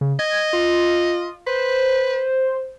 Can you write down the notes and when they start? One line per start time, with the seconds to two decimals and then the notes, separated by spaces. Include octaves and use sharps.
0.01 C#3
0.19 D#5 G#6
0.53 F4
1.47 B4 C5